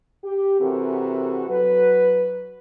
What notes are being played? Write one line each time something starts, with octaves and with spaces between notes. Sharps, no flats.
G4
C3 E3 C4 F#4 A4 A#4
F#3 B4